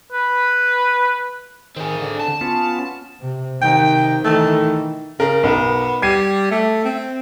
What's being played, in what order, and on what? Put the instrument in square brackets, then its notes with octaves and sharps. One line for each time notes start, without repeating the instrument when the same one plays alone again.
[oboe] B4
[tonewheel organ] D#3 [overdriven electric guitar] C4 G#4
[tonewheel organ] D3
[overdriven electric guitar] A5
[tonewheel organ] B3 C#4 F4
[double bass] C3
[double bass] C3 D#3 [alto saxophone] G5
[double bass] D#3 E3 [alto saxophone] A3
[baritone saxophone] C#3 [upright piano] A#4
[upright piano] B1 A#4 [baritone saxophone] B3
[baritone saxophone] G3 [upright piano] G#6 C7 D#7
[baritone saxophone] A3
C4